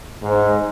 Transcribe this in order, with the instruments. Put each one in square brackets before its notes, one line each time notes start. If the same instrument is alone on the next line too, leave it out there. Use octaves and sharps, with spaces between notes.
[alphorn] G#2